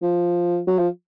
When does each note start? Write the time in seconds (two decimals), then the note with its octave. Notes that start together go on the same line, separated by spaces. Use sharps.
0.02 F3
0.67 F#3
0.78 F3